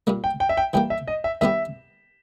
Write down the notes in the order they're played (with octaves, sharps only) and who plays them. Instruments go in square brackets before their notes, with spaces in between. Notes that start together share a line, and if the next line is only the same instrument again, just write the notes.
[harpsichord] A#2 G3 A#3
[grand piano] G5
G5
E5
G5
[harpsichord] E3 G3 A#3 [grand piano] G5
[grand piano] E5
D#5
E5
[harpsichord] D#3 G3 B3 G4 [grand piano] E5